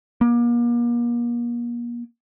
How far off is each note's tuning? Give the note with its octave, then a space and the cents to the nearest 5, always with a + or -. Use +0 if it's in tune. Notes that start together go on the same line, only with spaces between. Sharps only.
A#3 +40